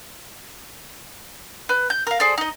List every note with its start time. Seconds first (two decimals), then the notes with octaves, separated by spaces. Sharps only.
1.69 B4
1.90 G6
2.07 A#4 F5
2.20 G#4 A4 C5 D5
2.38 D#4 D#5